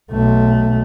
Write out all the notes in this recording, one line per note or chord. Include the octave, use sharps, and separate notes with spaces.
B1 A3